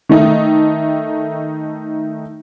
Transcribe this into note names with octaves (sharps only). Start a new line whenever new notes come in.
D#3 A3 D#4